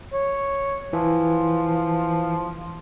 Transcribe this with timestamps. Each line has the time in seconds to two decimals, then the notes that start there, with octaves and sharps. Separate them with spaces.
0.13 C#5
0.93 E3 F3